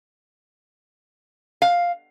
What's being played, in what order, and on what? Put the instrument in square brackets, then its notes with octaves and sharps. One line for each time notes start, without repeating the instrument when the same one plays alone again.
[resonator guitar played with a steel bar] F5